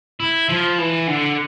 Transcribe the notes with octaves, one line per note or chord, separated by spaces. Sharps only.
E4
F3
E3
D3